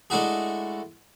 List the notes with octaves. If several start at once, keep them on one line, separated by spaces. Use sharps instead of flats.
G#3 A3 D4 E4 F#4 G#4